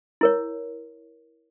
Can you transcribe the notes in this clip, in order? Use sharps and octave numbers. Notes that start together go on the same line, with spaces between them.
E4 A#4 C#5